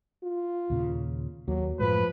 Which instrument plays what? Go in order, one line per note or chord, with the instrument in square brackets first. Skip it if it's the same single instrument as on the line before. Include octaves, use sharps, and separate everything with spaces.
[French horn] F4
[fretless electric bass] D#2 A#2 C#3
[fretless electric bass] D#2 A#3 [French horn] F#3
[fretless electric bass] F#2 A2 G#3 [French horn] F3 [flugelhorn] B4